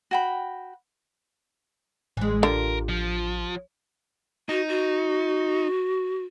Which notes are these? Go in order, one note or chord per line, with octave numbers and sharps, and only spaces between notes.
F#4 G5 B5
A1 E3 G#3
D3 F4 G4 A#4
F3
D#4 F#4
F#4